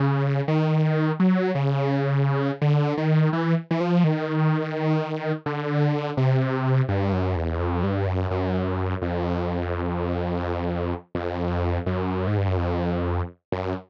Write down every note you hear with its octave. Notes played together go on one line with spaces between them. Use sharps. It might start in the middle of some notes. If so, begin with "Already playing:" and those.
Already playing: C#3
D#3
F#3
C#3
D3
D#3
E3
E3
F3
D#3
D3
C3
G2
F#2
E2
F2
G2
F#2
F#2
F2
F2
F#2
G#2
G2
F#2
F2
F#2